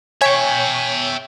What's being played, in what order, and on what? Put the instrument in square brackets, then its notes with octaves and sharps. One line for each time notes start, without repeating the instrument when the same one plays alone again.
[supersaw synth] C#5 [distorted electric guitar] E5 G5 [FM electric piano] G#5